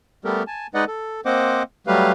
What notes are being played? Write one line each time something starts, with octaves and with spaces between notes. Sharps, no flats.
G3 A3 B3 G4 A4 A#4
G#5 A5
G#3 D#4 B4 D5 D#5 F#5
A4
A#3 C4 C5 D#5 F#5 D6
F#3 G3 A3 G4 B4 F5